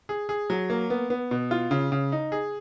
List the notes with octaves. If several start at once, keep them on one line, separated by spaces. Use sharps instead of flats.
G#4
G#4
F#3
A#3
B3
B3
B2
F4
C#3
C#3
D#4
G#4